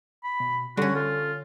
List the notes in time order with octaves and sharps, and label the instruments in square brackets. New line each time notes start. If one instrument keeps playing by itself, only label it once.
[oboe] B5
[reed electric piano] B2
[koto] D3 C#4 [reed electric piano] G3 [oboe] F#4
[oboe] F4 [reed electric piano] A4